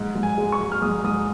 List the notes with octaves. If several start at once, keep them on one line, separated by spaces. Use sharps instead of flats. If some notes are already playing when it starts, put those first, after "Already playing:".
Already playing: G#2
G#2
G#5
G#3
C#6
G#3
F6
G#2 D#6
G#2 D#6